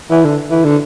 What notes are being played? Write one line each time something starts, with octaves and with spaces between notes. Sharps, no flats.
E3
D3
E3
D3